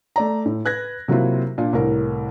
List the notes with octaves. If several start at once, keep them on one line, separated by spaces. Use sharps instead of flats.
A3 D5 A#5
A2
B4 F#6 G#6 A#6
C3 F#3 A#3 E4 F4
A#2 D4
C2 A2 A#4